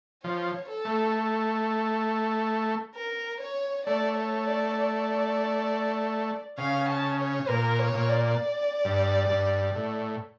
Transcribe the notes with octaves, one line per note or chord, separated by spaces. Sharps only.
F3 C#5
A4
A3
A#4
C#5
A3 D5
C#5
D5
D5
C#3 F5
A5
C#5
A#2 A#4
C#5
A#2
D5
G2
G2
A2